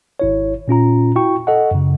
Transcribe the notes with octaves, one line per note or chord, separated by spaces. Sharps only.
G#1 E4 C#5
A#2 C#4 F4 A#5
E4 F#4 G5 C#6
A4 D#5 F#5
F#2 C#3